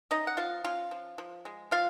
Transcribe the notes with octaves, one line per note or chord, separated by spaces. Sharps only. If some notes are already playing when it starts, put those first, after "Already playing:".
C#4 D#4 D#5
F#5
F3 F4 F5
C#4 F4 F5
F3
F3
G#3
F3 F4 F5